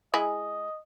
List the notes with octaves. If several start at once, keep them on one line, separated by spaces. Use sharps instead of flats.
G#3 E4 G#4 D#5